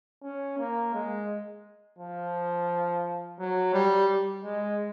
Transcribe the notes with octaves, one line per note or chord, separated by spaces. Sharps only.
C#4
A#3
G#3
F3
F#3
G3
G#3